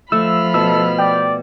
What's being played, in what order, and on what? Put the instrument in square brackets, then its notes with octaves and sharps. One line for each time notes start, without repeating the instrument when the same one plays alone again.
[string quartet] F3 B5 F6 [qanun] A3 [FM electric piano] E6
[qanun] B2 [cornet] A4 [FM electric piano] E6
[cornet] D5 [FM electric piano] G5